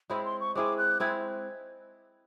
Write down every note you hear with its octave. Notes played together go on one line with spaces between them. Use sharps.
G#3 C4 E4 G#4 B5
C6
C#6
G#3 C4 E4 G#4 D6
F#6
G#3 C4 E4 G#4 G#6